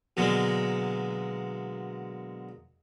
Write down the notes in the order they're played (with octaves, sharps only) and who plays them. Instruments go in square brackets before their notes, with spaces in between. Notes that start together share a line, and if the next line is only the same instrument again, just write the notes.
[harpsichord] B2 D3 F#3 G#3 A#3